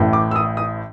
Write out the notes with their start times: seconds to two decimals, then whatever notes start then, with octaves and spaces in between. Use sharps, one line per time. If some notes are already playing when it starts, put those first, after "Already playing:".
Already playing: A1 A2 E3
0.13 D6
0.31 E6
0.36 D#6
0.57 D#6